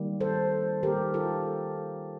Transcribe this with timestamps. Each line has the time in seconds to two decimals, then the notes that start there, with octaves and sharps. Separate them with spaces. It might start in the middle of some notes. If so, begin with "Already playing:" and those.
Already playing: D#3 G3 A#3
0.20 A4 C5
0.83 D#3 G3 A#3 G4 A#4
1.14 F4 A4